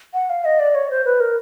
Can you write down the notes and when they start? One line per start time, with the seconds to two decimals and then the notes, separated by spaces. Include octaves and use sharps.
0.14 F#5
0.30 F5
0.45 D#5
0.60 D5
0.75 C#5
0.90 C5
1.05 B4
1.20 A#4